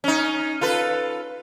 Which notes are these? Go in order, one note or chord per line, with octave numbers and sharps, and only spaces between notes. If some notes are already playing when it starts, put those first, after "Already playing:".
C#4 D#4
F4 A4 B4